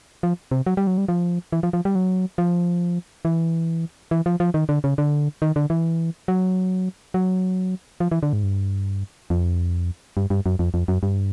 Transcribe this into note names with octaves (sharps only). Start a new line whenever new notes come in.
F3
C3
F#3
G3
F#3
G3
F3
E3
F3
F3
G3
F#3
F3
E3
E3
F3
F3
D#3
D3
C#3
D3
D#3
D3
E3
F#3
F#3
F3
E3
D3
G#2
G2
F2
G2
G2
F#2
F2
F2
F#2
G2